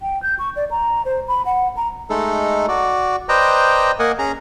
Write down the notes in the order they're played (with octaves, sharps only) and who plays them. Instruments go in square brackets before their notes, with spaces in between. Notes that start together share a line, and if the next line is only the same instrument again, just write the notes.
[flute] G5
G6
C#6
D5
A#5
C5
B5
F#5
A#5
[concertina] G#3 A3 D#4 A4
F#4 D5
B4 C5 D5 D#5 G5 A#5
A#3 A#4 D#5 F#5 G#5
C#4 G#4 A#5